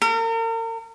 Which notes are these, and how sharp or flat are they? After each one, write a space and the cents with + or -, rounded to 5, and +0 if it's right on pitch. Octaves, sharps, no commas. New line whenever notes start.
A#4 -40